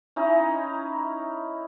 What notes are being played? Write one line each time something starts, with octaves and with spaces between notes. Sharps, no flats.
C#4 D#4 E4